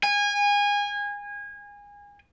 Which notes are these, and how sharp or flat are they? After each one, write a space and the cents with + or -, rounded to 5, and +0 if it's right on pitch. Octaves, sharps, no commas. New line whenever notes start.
G#5 -25